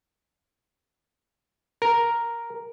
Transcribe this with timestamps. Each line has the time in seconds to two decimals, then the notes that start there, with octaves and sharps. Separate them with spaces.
1.82 A#4